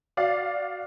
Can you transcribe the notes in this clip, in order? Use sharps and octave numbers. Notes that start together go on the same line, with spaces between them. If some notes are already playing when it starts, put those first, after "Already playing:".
F#4 D5 F5